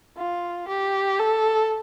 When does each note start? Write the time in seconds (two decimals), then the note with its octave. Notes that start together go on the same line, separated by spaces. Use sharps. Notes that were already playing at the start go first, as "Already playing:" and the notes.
0.18 F4
0.69 G4
1.19 A4